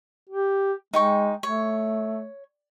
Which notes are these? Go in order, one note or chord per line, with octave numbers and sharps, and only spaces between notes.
G4
G#3 D#4 G5 C#6
A3 C#5